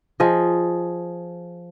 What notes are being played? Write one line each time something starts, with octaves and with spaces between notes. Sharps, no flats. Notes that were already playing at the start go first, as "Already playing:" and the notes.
F3 G#4 D#5